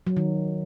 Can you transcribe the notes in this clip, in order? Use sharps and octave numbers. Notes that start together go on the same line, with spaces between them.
F#3
D#3